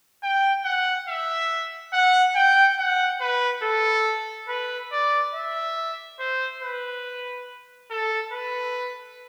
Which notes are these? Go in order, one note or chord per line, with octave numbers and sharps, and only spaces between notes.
G5
F#5
E5
F#5
G5
F#5
B4
A4
B4
D5
E5
C5
B4
A4
B4